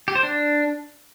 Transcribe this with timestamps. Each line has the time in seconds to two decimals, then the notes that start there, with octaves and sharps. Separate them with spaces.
0.08 G4
0.15 C5
0.23 D4